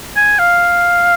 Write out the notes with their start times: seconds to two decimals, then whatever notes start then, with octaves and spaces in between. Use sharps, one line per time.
0.16 G#5
0.39 F5